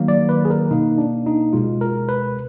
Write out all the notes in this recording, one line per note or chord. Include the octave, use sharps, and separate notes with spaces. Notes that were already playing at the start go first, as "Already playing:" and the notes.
Already playing: D#3 F#3 A#3
D5
B4
G#4
A#4
B2 A#3 D#4
D4
D#4
B2 G#3 F4
A#4
B4